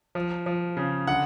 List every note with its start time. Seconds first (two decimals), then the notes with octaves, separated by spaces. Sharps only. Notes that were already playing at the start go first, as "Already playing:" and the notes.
0.15 F3
0.46 F3
0.77 C#3
1.07 D3 F#5